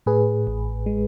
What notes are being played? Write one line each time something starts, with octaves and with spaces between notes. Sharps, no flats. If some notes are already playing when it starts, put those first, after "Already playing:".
A2 G#4 B4
A1
G#3